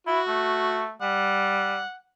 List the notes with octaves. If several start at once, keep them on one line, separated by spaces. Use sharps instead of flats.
E4 F#4
A3
G3 F#5